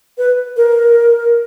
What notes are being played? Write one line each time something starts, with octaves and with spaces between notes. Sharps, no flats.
B4
A#4